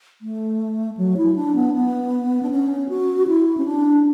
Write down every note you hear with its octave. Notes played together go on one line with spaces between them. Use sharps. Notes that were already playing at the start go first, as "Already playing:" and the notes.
A3
F#3
E4
D4
B3
B3
D4
C#4
F#4
E4
C#4
D4